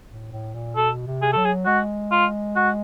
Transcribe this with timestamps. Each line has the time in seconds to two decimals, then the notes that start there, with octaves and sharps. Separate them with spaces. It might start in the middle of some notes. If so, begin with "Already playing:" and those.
0.10 A2
0.32 A2
0.54 A#2
0.76 B2 A4
1.07 C3
1.22 G#4
1.33 F#3 A4
1.45 G#4
1.66 G#3 F#4
2.12 F4
2.56 F#4